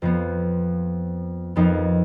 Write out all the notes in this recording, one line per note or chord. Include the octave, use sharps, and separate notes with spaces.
F2 F3 B3
F2 F3 B3 D#4 A#4